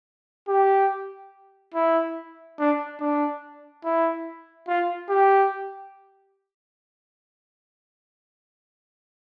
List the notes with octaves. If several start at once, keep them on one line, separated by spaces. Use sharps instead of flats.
G4
E4
D4
D4
E4
F4
G4